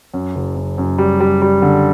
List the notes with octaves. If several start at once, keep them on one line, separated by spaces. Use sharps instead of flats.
F#2
F#1
F#2
F#2
G3
G3
G3
D3